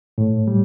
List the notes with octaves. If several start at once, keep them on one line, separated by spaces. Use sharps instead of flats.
A2
G3